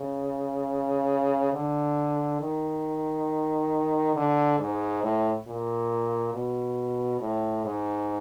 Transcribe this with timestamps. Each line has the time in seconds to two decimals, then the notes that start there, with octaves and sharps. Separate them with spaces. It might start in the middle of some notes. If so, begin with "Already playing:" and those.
Already playing: C#3
1.54 D3
2.41 D#3
4.16 D3
4.59 G#2
5.03 A2
5.47 A#2
6.34 B2
7.21 A2
7.65 G#2